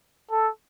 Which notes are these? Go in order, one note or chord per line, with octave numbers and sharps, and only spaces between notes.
A4